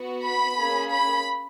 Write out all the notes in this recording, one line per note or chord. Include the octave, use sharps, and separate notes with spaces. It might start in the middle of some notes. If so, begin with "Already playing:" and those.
Already playing: B3 F#4
B5
A#3 C#4 G#4
B5